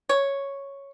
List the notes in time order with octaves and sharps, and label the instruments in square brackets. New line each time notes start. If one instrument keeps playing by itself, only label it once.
[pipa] C#5